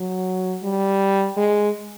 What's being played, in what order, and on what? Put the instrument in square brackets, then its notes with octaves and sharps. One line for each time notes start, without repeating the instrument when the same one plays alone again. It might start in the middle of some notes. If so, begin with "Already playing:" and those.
Already playing: [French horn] F#3
G3
G#3